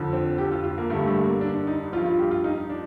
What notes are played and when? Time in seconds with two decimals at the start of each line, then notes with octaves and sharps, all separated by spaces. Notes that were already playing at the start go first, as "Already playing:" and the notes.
Already playing: F2 D3 F3
0.13 C4
0.38 G4
0.51 F4
0.64 F4
0.78 A#3
0.90 G2 D3 G3 A3
1.07 A3
1.24 A#3
1.41 D4
1.67 D#4
1.93 F3 F4
1.97 G2
2.05 F4
2.19 G4
2.31 F4
2.44 D#4
2.70 D4